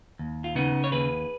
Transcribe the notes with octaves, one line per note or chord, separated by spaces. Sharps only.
D#2
F4
C#3 B3 D#4
C#5
D#2 G#4 B4